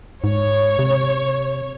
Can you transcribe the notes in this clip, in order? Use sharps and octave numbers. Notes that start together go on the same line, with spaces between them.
G#2 C#5
C3